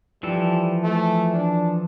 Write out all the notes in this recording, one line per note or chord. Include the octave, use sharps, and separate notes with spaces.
E3 F3 G3 A4
A3
D4